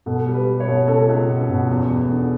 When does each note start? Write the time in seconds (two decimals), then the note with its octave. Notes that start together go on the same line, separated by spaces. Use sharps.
0.06 B2 A4
0.27 G3
0.33 B4
0.47 G3
0.60 C#5
0.68 B2
0.88 C#2 A4
1.09 C#2
1.29 B2
1.49 B2
1.69 E2
1.90 E2
2.10 D3